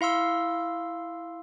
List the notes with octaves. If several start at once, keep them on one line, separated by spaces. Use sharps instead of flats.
E4 F5 C6 E6